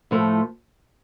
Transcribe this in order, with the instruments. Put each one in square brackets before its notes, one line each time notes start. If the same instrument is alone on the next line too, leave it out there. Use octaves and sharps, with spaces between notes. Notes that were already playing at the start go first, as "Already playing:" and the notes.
[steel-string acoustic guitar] A2 F3 A3